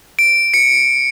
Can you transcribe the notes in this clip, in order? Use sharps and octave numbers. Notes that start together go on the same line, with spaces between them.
D7
C#7